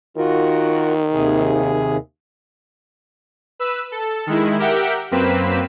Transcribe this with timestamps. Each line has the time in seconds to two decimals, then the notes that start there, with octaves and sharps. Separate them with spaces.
0.17 D#3 F4 F#4 A#4
1.13 D#2 C3 G#4
3.59 B4 E6
3.92 A4
4.27 D#3 G#3 E4
4.59 G4 A#4 E5 F#5 G5
5.11 F#2 A#3 C4 B4 B6 E7